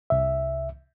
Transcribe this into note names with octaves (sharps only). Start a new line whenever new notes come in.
C2 E5